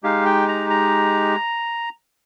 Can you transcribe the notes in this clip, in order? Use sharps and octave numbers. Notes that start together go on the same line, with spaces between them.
G#3 D#4 G4 F5
G5
A#5
A#5